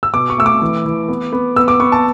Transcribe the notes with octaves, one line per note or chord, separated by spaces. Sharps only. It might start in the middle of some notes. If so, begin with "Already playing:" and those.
E6
B2 D6
C#6
A3 E6
D6
E3
E3
B3
B3
B3 E6
D6
B3 C#6
A5